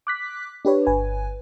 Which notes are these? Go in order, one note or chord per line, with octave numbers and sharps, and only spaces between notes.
D6 F#6 B6
D4 G4 B4 C#5
G1 B4 G#5